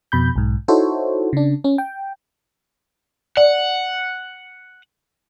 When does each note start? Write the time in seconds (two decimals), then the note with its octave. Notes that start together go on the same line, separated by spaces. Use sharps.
0.12 F2 B2 B5 G6
0.36 B1 G#2
0.68 D#4 E4 F#4 A4 C5 C#5
1.33 C#3 D4
1.64 C#4
1.78 G5
3.37 D5 F#5